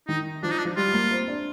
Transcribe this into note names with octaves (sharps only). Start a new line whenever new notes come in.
D#3 D#4
F3 D4
D#4
D4
F3
G3 F4
A#3
C4
D4